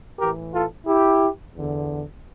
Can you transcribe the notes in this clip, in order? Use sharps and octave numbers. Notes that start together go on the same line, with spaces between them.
A2 E3 G4 A#4
F4 A4
E4 G4
E2 D3